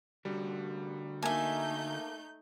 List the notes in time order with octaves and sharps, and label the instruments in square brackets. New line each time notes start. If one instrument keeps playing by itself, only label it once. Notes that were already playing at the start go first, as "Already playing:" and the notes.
[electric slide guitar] D3 F#4 A#4 [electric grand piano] G3
[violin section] A3 D#4 G6 [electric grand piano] A#3 A5 [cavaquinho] E5 G#5